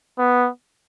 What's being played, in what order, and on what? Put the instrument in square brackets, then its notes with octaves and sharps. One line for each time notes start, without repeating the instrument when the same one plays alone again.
[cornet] B3